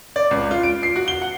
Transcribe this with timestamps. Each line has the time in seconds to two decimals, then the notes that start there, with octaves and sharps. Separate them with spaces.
0.16 D5
0.31 C#2
0.51 F4
0.63 D7
0.83 C7
0.96 F#4
1.08 G7
1.22 F#5